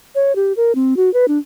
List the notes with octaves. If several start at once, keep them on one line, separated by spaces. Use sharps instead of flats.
C#5
G4
A#4
C4
F#4
B4
D4